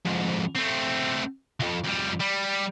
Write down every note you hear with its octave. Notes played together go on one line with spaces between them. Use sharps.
F2 G#2
A3 C4
C2 F2
F2 G3
G3